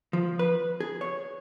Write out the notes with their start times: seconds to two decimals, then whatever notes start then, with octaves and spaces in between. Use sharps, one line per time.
0.13 F3
0.39 B4
0.80 G#4
1.01 C#5